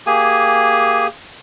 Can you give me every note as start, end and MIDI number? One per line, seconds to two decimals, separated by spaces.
0.07 1.07 58
0.07 1.07 67
0.07 1.07 68
0.07 1.07 80